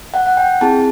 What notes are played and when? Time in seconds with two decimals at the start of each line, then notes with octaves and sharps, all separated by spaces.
0.14 F#5
0.26 F#5
0.37 G5
0.61 C4 E4 G#4 A5